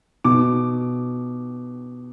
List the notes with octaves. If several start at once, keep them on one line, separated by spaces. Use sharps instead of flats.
B2 D6